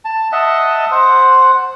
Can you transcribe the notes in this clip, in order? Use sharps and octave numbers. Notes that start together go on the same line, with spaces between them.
A5
D#5 E5 F#5 A5
C5 F#5